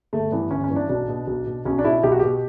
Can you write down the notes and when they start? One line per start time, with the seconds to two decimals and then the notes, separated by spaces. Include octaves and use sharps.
0.13 G1 A3
0.32 G2 E3 B3
0.51 G1 C#4
0.64 C#4
0.70 G2 E3
0.76 D4
0.89 B1 D4
1.08 B2
1.27 B1
1.46 B2
1.65 B1 C#4
1.79 D4
1.85 B2 E4
2.03 B1 G4
2.12 F#4
2.19 B2 G4